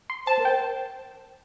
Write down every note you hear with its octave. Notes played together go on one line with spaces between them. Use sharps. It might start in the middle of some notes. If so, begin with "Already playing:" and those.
C6
C5 A5
A#4
G5
C5